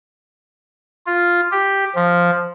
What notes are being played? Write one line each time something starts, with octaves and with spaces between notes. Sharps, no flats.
F4
G4
F3